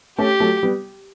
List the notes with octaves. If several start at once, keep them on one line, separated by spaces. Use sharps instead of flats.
A3 C#4 G4
F#3 A3
G3 B3